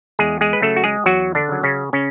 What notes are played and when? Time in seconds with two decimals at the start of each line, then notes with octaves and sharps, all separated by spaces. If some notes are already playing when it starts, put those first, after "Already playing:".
0.19 E2 G#3 G#4
0.41 G#3 G#4
0.53 B4
0.62 C#3 F#3 A3 A4
0.76 F#4
0.84 G#3 G#4
1.06 E2 F#3 F#4
1.35 D3 D4
1.49 C#3 F#3
1.63 C#3 C#4
1.93 C#3 C#4